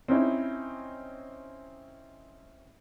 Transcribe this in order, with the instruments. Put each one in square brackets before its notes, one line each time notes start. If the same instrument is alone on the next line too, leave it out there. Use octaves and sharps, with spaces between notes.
[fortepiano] C4 C#4 D#4 E4